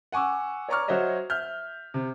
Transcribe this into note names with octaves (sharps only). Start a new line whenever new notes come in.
F#5 G#5 C#6 D6 E6
C#5 D5 A#5 C#6 D6 F6
F#3 F#4 C5 C#5 D#5 E5
E5 F6 G6
C3